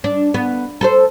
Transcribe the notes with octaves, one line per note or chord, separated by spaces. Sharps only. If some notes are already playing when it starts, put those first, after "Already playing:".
D4
B3
A4 A#4 C5